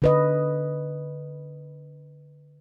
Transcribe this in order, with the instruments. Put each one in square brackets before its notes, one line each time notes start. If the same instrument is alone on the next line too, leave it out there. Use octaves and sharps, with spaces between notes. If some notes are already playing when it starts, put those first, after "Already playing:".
[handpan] D3 B4 D#5